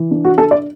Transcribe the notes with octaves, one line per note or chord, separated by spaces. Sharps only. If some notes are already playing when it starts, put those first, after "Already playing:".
Already playing: E3
D4
F#4
D4 A4
D5